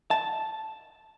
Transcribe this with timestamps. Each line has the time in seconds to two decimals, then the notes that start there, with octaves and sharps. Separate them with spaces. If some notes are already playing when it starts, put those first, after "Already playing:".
0.11 A5